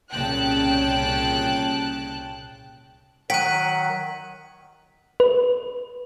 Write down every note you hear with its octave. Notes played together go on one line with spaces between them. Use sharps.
C2 A#2 C#3 G5 A5 F#6
D#3 F#3 F#5 G5 F#6 B6 D#7
B4